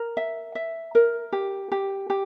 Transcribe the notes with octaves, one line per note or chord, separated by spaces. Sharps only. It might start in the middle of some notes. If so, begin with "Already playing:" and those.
Already playing: A#4
E5
E5
A#4
G4
G4
G4